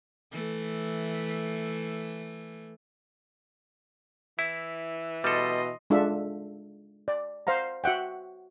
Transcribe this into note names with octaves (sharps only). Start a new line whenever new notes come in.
E3 A3
E3 E4
B2 G3 A4 D#5 C6
G#3 D4 F4 A4 E5
D5
C5 F5 F#5 A#5
F#4 E5 F#5 G5